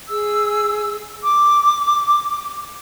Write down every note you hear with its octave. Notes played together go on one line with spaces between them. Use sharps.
G#4 E6
D6